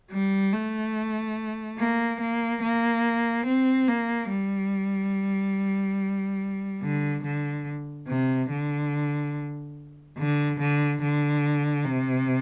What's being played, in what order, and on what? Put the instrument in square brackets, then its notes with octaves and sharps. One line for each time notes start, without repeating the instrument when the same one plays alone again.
[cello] G3
A3
A#3
A#3
A#3
C4
A#3
G3
D3
D3
C3
D3
D3
D3
D3
C3